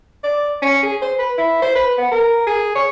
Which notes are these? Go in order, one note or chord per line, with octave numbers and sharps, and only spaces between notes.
D5
C#4
G#4
C5
B4
E4
C5
B4
B3
A#4
G#4
C#5